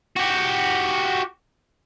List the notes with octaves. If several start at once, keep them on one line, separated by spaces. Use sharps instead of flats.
F#4 G4